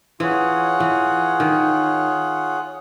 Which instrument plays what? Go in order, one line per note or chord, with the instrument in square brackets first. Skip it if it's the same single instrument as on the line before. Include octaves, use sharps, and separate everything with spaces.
[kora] E3 [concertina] F4 G#4 C#5 F#5
[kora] E3
D#3